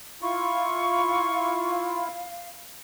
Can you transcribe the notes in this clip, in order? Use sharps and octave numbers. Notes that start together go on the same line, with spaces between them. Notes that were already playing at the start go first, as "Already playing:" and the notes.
E4 F4 F5 C#6